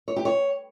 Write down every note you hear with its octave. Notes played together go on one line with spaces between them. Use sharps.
C#5
G4
C#5